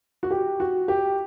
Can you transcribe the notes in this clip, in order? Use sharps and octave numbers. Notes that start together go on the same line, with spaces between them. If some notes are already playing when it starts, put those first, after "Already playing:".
F#4
G4
F#4
G4